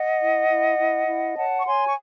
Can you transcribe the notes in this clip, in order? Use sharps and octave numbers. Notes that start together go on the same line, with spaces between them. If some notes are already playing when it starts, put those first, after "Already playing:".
Already playing: D#5 F#5
E4
E4
E4
E4
C#5 F#5 A5
C#6
C#5 G#5 C6
C#6